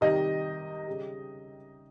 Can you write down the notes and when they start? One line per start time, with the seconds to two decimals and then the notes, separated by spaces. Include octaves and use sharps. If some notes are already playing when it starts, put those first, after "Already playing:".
0.01 C3 D#3 G3 D#5
0.87 C#3 G3